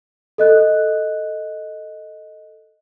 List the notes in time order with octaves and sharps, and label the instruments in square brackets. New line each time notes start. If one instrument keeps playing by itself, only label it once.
[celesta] A4 D#5 F#6